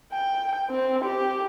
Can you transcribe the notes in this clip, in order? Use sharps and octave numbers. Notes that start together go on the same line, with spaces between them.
G5
C4
G4